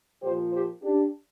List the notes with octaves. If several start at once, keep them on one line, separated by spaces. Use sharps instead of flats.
A#2 F3 G4 C5
G4 C5
D4 G4